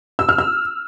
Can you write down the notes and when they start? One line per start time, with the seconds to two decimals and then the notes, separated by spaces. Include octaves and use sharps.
0.19 E6
0.29 F6
0.38 E6